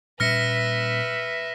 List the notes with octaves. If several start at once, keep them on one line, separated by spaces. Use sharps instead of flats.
A#2 G3 C#4 B4 E5 F6 A#6 C#7